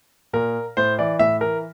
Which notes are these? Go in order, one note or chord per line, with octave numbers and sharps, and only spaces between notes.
A#2 A#4
A2 C5
E3 D5
A2 E5
E3 A#4